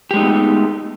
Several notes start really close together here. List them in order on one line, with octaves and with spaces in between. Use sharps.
G4 G#3 D#4 A3 B3